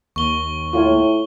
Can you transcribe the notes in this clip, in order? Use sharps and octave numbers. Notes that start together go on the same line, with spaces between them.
D#2 C#6 G7
A2 F4 C#5